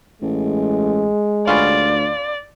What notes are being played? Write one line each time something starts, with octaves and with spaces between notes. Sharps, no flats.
A1 G#3
D2 B3 C#4 F4 D5